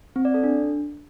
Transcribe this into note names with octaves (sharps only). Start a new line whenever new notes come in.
C4
D5
A4
D4